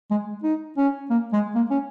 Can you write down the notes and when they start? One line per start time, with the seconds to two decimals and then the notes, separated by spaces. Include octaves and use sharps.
0.11 G#3
0.43 D#4
0.77 C#4
1.10 A#3
1.33 G#3
1.55 A#3
1.71 C#4